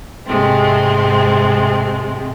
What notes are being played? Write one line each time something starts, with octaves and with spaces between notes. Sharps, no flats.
G#2 C3 G#3 A3 C4